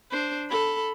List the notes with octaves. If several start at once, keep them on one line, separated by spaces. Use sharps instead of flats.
D4 C5
A4 B5